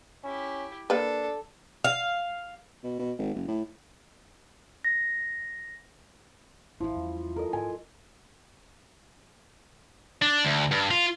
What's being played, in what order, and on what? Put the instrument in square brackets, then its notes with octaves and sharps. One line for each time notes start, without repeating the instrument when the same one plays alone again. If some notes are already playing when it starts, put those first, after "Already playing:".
[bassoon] C#4 [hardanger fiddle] E4 G4
[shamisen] A#3 B4 [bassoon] D4 [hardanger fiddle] A4
[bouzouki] F5
[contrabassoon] B2
B2
G#1
F#1
A2
[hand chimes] A#6
[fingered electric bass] G#1 [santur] F3 [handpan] E4 F4
[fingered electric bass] E2 G3 C#4
[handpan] A4 [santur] A#4 D#5
[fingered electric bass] G#2 [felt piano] G#5
[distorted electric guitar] D4
D2
G2
F4